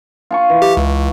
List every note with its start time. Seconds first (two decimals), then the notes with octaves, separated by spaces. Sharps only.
0.31 F4 G#5 C#6
0.49 E3
0.62 G4
0.77 C#2